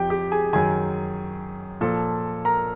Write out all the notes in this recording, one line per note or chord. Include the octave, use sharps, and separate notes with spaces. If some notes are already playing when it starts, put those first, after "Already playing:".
Already playing: F2 F3 G4 G5
G4 G5
G#4 G#5
F#2 D#3 G#4 G#5
A#2 F3 A4 A5
A#4 A#5